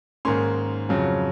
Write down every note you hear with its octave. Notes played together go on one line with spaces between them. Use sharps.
G#2 D#3 A#3 C#4 C6
F2 C#3 F#3